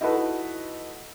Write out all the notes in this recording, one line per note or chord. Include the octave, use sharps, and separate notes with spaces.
D#4 E4 F#4 A4 B4